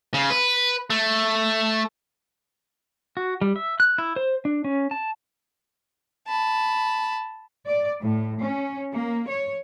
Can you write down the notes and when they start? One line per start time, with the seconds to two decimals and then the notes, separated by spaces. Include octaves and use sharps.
0.14 C#3
0.30 B4
0.90 A3
3.17 F#4
3.41 G3
3.56 E5
3.80 F#6
3.98 E4
4.16 C5
4.45 D4
4.64 C#4
4.91 A5
6.27 A5 B5
7.67 D5
8.01 A2
8.41 C#4
8.94 A#3
9.30 C#5